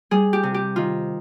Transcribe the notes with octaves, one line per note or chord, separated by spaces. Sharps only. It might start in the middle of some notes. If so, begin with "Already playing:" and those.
G3 G#4
G4
C3
G4
D#3 F4